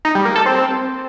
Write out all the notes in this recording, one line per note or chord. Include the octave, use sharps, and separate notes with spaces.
D#4
G3
A#3
A4
C4